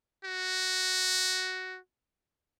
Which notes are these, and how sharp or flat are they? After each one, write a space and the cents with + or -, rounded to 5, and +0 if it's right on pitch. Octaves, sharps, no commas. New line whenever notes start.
F#4 +5